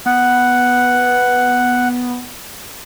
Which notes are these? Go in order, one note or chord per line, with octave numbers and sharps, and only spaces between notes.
B3 F#5